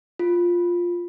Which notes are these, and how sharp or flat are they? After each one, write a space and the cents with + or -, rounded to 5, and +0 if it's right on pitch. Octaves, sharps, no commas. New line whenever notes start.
F4 +5